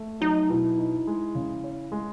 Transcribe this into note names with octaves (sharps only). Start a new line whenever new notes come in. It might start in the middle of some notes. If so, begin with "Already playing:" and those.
Already playing: A3
F#3 D#4
B2 E4
D#4
G#3
C#3
C#4
G#3